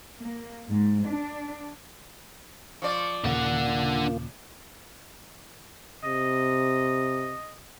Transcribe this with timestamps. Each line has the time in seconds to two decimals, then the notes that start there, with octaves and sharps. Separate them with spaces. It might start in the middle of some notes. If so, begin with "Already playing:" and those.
0.21 A#3
0.69 G#2
1.06 D4
2.82 F3 D5 C#6
3.24 D#2 A#2 C#3 A#3 D4 F4 F#5
6.04 C3 D#5